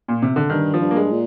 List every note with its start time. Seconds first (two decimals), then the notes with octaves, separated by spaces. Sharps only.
0.08 A#2
0.22 C3
0.36 D3
0.50 G2 D#3
0.74 F3
0.81 G2
0.91 A#3
0.96 G#3
1.11 A#2